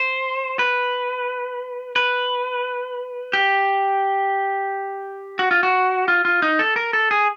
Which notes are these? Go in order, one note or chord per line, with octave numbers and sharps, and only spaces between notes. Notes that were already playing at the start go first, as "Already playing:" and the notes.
Already playing: C5
B4
B4
G4
F#4
F4
F#4
F4
F4
D#4
A4
A#4
A4
G#4